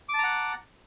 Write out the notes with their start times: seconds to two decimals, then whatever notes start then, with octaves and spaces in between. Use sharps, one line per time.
0.09 D6
0.14 A5
0.19 A#5
0.23 F#5